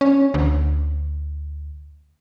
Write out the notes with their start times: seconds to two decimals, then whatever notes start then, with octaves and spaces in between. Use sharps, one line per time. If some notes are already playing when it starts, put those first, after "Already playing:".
0.01 C#4
0.34 D2